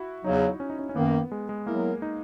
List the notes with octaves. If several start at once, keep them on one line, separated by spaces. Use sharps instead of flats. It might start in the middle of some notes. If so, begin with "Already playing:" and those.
Already playing: E4 F#4
E2 C#3 F#3 D#4
C#4
D#4
C#4
C#4
F#2 D#3 A#3 B3
G#3
G#3
F#3 A#3 B3 E4 A#4
D#4